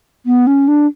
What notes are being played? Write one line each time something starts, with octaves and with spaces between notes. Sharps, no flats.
B3
C#4
D4